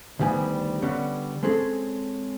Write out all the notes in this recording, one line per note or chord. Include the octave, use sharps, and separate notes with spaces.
D2 D#3 G3 B3 G#5
D3 G3 B3 C#4
G#3 C4 C#4 G#4 A4